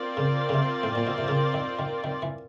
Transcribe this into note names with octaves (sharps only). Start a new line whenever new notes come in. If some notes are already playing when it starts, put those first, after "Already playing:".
Already playing: C4 F4 A#4 D5
C#3
C#3
C3
A2
A#2
B2
C3
C#3
D#3
D#3
D#3
E3